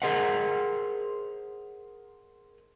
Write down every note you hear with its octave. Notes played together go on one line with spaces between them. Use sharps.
G#4 A#4 C5 D#5 F#5